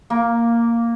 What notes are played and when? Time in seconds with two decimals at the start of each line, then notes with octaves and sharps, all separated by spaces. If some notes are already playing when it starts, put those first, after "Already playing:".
0.10 A#3